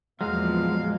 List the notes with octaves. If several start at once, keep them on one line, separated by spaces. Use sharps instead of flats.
E2 A#2 F3 F#3 G#3 F5